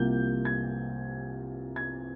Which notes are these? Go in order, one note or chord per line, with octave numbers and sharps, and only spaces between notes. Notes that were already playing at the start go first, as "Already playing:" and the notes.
Already playing: C2 C3 F3 A#3 G6
G#6
G#6